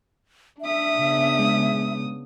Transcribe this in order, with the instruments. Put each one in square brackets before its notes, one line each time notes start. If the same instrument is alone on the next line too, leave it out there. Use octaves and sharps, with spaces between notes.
[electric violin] D4 D#6 [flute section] E5
[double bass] C#3 B3
[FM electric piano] G#3